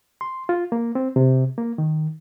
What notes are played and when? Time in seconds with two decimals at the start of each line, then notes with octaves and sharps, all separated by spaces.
0.21 C6
0.49 F4
0.72 A#3
0.95 C4
1.16 C3
1.58 A#3
1.78 D#3